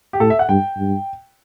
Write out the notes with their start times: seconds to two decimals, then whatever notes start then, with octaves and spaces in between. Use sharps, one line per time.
0.13 G4
0.20 A2 A4
0.30 E5
0.39 F#5
0.49 G2 G5
0.77 G2